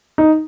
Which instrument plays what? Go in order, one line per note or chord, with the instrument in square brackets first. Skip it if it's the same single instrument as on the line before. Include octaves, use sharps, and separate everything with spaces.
[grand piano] D#4